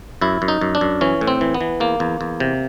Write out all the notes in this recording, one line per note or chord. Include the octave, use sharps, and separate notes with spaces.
F#2 E4
F#2
D#4
F#2
D4
F#2
E3 C#4
A2
C4
E3
B3
E3
E2 A#3
E2
E2
C3